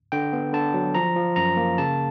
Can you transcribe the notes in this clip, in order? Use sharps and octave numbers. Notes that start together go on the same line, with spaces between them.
D3 G5
B3
D3 A5
F#3
F3 A#5
F3
F#2 A#5
A#3
C#3 A5